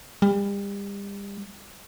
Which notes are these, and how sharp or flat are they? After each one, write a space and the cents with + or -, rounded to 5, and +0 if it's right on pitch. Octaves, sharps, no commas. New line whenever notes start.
G3 +35